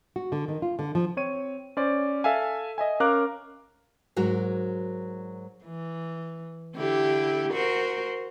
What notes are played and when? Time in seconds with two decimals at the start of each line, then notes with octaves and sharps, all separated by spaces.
0.16 F#4
0.32 D3
0.48 D#3
0.62 F4
0.79 D3
0.95 F3
1.17 C4 C#5 D#7
1.77 C#4 C5 D5
2.24 A4 E5 F5 G#5
2.78 D#5 E5 G#5
3.00 C#4 A#4 F5 D6 F#6
4.16 G#2 F#3 F#4 A#4
5.64 E3
6.76 D3 E4 G4
7.53 F#4 A#4 C5